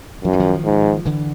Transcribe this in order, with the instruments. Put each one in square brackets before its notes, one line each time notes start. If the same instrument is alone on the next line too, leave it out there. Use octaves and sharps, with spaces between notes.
[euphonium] F#2 [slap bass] F3
[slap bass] E3
D#3 F3
[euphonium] G#2
[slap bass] D3 E3